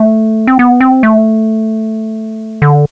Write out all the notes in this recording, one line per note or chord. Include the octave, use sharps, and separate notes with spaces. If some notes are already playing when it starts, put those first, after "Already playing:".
Already playing: A3
C4
B3
C4
A3
D3